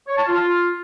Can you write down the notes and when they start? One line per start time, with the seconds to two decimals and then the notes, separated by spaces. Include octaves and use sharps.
0.08 C#5
0.17 A5
0.27 F4